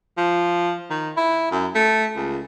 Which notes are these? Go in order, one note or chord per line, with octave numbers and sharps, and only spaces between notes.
F3
D#3
E4
F#2
A3
C#2